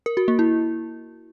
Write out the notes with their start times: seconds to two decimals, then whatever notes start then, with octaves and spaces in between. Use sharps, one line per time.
0.06 A#4
0.17 F#4
0.28 A#3
0.39 E4